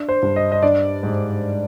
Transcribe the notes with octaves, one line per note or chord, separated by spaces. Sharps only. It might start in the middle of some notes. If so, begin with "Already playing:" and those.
Already playing: D4
C5
G2
D#5
D#5
D4 D5
G#2